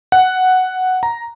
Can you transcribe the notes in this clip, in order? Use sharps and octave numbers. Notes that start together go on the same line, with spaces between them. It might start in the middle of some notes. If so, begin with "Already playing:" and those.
F#5
A#5